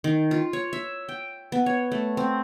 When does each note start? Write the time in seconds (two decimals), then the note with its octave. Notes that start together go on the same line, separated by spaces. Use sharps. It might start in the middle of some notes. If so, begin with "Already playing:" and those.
0.04 D#3
0.31 F4
0.53 C#5
0.73 E5
1.09 G5
1.52 B3
1.66 C#5
1.92 A3
2.17 C4